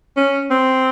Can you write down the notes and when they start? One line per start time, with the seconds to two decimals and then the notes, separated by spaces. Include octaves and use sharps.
0.17 C#4
0.51 C4